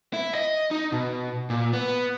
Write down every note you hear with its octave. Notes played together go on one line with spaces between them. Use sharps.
E4
D#5
D#4
B2
A#2
B3